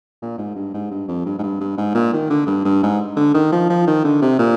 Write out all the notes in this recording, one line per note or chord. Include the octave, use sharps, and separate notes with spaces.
A#2
G#2
G2
G#2
G2
F2
G2
G#2
G2
G2
G#2
A#2
D#3
D3
G2
G2
G#2
D3
D#3
F3
F3
D#3
D3
C3
A#2